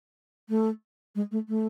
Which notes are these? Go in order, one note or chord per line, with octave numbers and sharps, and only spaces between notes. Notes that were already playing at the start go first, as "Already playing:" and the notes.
A3
G#3
A3
A3